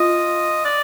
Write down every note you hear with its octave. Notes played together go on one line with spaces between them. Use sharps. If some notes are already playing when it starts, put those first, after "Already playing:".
Already playing: F4 D#5
D5